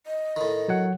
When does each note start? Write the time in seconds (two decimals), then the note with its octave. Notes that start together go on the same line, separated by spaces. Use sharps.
0.07 D#5
0.36 A2 D#3
0.68 F#3 C#5 F#5